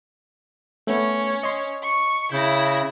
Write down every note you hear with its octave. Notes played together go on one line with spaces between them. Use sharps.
A3 B3 C#4
D#5 C6
C#6
C#3 E4 G6 A#6